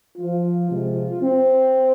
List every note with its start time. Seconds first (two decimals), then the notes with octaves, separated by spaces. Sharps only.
0.18 F3 F4
0.70 C3 F3 G#3
1.22 C4